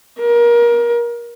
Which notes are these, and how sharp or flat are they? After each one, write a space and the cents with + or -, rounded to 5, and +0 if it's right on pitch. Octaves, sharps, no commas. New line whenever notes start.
A#4 +25